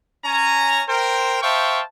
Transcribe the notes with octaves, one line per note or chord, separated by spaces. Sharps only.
C#4 G#5 A#5
A#4 C5 G5
C5 E5 F5 G5 A5 C#6